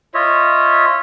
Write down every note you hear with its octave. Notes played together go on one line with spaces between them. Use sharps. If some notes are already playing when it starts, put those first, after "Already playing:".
F4 C#5 D#5 E5